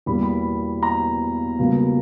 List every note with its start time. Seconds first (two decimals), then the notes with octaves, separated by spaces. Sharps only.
0.06 E2 B2 G3 A#3 B5
0.23 B5
0.83 A#5
1.59 C#2 B2 G3 A#3